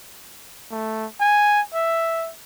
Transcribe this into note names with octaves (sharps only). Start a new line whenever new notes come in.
A3
G#5
E5